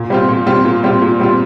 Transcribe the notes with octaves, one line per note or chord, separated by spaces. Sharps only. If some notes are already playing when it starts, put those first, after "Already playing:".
Already playing: A#2
G3 C4 F4
A#2
G3 C4 F4
A#2
G3 C4 F4
A#2
G3 C4 F4